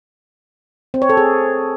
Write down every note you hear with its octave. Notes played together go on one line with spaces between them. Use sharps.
C4
C#5
A4
G#4